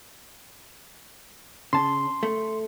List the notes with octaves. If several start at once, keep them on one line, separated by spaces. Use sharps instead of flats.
C#3 A5 C6
A3